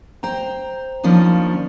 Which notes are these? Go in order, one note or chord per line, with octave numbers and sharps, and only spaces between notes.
C5 G5 A#5
D#2 D#3 F3 C#4 D4